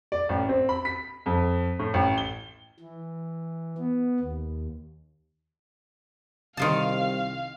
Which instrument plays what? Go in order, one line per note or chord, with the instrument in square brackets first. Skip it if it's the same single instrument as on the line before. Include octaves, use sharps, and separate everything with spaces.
[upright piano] D5
A1
C4
B5
B6
F2
A2
A1
G7
[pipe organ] E3
B3
D#2
[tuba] C2 [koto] D#3 F4 A5 [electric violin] F5